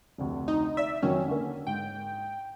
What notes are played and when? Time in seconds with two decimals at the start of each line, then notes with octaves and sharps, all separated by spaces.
0.18 F1 D2
0.48 D#4
0.77 D5 E5
1.03 F2 D#3 F#3 C#4
1.28 D3 A#3
1.67 G#2 G5